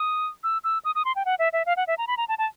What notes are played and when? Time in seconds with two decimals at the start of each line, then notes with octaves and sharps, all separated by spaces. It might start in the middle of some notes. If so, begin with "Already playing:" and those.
Already playing: D#6
0.44 E6
0.64 E6
0.85 D#6
0.95 D#6
1.05 C6
1.16 G5
1.25 F#5
1.39 E5
1.53 E5
1.66 F5
1.77 F#5
1.87 E5
1.98 A#5
2.07 B5
2.17 A#5
2.28 A5
2.38 A5